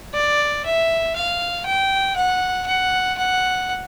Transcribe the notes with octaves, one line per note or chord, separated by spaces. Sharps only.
D5
E5
F5
G5
F#5
F#5
F#5